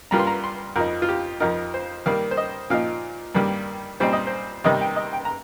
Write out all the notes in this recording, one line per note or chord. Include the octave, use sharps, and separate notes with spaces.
G2 G3 A#3 F4 A#5
C6
A#5
C6
F2 F3 D#4 A#4
F4
G4
F2 F3 D#4 A#4
C5
D#3 G3 A#3 F5
C5
D#5
A#2 F3 D#4 F5
G2 D#3 G3 A#3
A#2 G3 C4 D#4 C5
D#5
C5
C3 D#3 G3 D#4 D#5
G5
D#5
G5
A#5